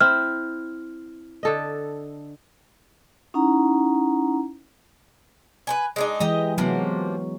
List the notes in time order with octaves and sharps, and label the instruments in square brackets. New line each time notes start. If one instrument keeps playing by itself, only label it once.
[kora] C4 E4 [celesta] F6
[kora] D3 A4 D#5
[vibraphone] C#4 D#4 E4 F#5 A#5
[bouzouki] B4 C5 G#5
G#3 D4 D#4
[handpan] E3 G#3 [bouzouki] G4 D#5 A#5
[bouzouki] C3 F3 A#3 [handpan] F#3 B3